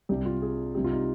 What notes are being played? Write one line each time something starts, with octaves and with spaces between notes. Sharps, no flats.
C2 C3 G3 G4
F4
G#4
C2 C3 G3 G4
F4
D#4